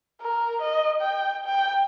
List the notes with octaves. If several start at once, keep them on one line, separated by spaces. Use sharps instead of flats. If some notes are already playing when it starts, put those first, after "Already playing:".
A#4
D#5
G5
G5